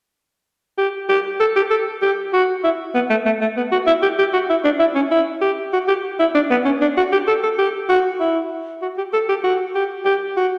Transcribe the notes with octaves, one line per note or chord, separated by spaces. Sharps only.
G4
G4
A4
G4
A4
G4
F#4
E4
B3
A3
A3
A3
B3
F#4
E4
G4
G4
F#4
E4
D4
E4
C#4
E4
G4
F#4
G4
E4
D4
B3
C#4
D4
F#4
G4
A4
A4
G4
F#4
E4
F#4
G4
A4
G4
F#4
G4
G4
F#4